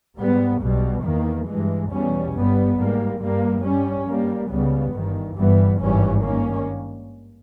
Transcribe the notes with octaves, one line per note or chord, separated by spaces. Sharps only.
G#2 G3 B3
B1 B2 G3
E2 D#3 A#3
G2 E3 G#3
E2 B2 G3 C#4
G1 G2 G3 B3
G#2 G3 A#3
G2 G3 A#3
G2 G3 C#4
G2 G3 A#3
C#2 C#3 G3 B3
G1 G2 D#3
G1 G2 E3 G3 B3
G#1 G2 E3 G3 C#4
G2 D#3 A#3 C#4